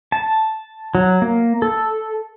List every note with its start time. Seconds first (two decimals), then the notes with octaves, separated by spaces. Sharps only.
0.12 A5
0.95 F#3
1.22 A#3
1.62 A4